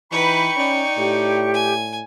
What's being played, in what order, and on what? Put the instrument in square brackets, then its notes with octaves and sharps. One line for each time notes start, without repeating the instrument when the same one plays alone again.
[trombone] E3 [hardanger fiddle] D#4 B4 [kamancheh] G5 C#6 [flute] B5
[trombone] C#4 [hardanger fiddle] D#4 D5
[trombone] A2 [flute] G4
[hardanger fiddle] G#5